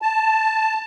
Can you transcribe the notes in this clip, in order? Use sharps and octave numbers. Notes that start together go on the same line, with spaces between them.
A5